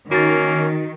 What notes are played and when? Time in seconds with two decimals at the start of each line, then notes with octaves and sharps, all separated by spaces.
0.11 D#3 A#3 C#4 F#4 A6